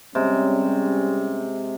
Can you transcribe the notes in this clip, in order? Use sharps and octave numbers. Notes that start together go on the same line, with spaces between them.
C3 G3 G#3 C4 C#4